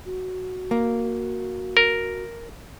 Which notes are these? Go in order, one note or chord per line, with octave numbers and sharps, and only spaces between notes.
F#4
A#3
A#4